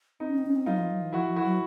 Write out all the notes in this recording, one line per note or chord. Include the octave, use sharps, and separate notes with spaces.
C4 D#4
C#4
C4
C#4
C4
F#3 D#4 F4
F3
F#3
E3
F3 E4 F#4
F3
E4 F#4
F#3